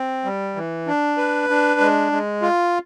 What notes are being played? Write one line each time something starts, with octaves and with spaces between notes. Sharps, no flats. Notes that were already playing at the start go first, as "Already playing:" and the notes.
Already playing: C4
G3
E3
D4
B4
D4
G#3
G#3
F4